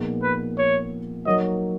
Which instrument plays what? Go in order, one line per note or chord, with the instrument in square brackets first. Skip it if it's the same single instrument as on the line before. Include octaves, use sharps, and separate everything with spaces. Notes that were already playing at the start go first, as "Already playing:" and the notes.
Already playing: [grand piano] A#2 F3 B3 D#4 G#4
[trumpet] B4
C#5
[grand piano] F#3 A#3 D#4 F#4 C#5 [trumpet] D#5